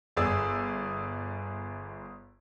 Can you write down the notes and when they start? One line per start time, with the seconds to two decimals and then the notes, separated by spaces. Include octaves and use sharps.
0.17 G1 G#4 D5 E6